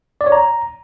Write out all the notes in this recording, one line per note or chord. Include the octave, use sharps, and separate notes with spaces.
D5
C#5
A#5